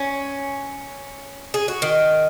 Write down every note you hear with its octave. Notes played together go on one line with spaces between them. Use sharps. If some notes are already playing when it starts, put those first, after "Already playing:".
Already playing: C#4
G#4
F#4
D#3